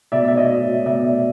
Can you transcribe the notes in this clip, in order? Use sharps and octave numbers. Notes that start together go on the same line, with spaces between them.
B2 D5 E5
E5
C#5 D#5
B2 D5 E5